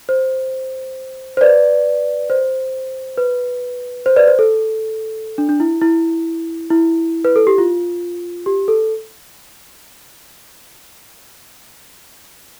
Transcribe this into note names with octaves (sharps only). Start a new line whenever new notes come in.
C5
C5
B4 D5
C5
B4
C5
B4 D5
C5
A4
D4
D4
E4
E4
E4
B4
A4
G4
F4
G4
A4